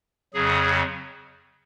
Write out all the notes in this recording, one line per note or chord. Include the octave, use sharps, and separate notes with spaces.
F2 C#3 F#3 G#4